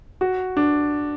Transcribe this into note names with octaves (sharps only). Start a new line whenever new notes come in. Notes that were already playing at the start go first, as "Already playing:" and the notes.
F#4
D4